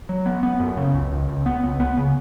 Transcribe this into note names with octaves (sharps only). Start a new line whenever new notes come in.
F#3
B3
B3
F#2
C#3
C#2
C#2
C#2
B3
C#2
B3
C#3